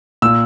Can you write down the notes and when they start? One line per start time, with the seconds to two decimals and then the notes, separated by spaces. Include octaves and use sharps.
0.22 A#2 E6